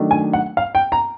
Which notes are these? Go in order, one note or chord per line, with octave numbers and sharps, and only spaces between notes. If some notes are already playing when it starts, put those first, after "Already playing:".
Already playing: D#3 F#3 A3 D4
G#5
F#5
F5
G5
A#5